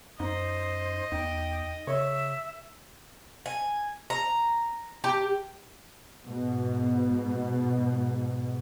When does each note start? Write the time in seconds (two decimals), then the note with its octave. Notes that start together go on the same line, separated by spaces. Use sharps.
0.20 F#2 D#4 C5 D#5
1.12 E2 D#4 G5
1.87 C#3 C#5 E5
3.46 G#5
4.10 A#5
5.04 G4
6.27 G#2 B2